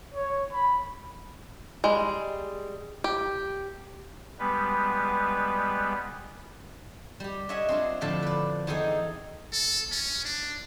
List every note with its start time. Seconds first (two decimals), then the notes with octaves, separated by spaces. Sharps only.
0.14 C#5
0.53 B5
1.84 G3 G#3
3.04 G4
4.39 G3 G#3 B3 B4
7.20 G3 G4
7.49 C#5 D#5 E5 F#5 G#5
7.69 C4 D4 F4
8.01 A2 D3 F3 A4 D5 A5
8.23 B4 D5
8.67 E2 D#4 G#4 A4 G5 G#5
9.53 A4
9.91 C#4
10.25 D4